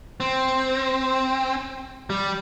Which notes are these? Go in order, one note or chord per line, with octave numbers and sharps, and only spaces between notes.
C4
G3